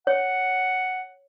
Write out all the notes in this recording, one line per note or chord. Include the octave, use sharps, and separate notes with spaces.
C#5 F#5